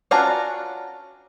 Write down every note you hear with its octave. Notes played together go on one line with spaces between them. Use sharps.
C#4 D4 F4 F#4 A#5